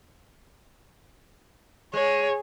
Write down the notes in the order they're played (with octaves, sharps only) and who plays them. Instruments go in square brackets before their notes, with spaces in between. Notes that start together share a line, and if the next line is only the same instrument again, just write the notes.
[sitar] G#3 [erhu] C#5